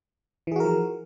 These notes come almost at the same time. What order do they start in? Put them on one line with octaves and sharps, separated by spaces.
E3 G#4 F#4 A#4 F3